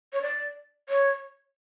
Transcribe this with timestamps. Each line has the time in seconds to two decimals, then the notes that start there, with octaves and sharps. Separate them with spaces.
0.13 C#5
0.22 D5
0.89 C#5